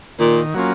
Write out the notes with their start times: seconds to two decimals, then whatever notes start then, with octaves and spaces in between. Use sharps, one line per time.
0.20 A#2 D#3
0.54 F#3 A#3 C#4 F4